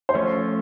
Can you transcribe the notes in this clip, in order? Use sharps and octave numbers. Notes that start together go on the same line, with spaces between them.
C5
F3 A3 C#4 F4 C#5